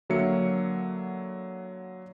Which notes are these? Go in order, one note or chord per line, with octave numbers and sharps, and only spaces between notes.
D3 F#3 A#3 E5 C#7